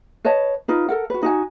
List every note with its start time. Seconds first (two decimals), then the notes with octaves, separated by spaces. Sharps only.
0.25 B4 C#5 D#5 A5
0.68 D#4 F4 B4
0.89 A4 A#4 F#5
1.10 F#4 B4
1.23 D#4 F#4 G#5